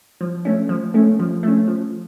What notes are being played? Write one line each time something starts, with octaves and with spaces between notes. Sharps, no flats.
F3
A3 C#4
F3
A3 C#4
F3
A3 C#4
F3